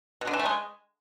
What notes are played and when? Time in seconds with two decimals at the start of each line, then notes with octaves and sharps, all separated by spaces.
0.21 B2
0.27 D3
0.33 E3
0.39 A3
0.46 G#3